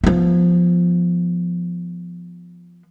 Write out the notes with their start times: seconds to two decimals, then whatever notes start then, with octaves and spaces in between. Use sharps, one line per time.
0.04 F3 B3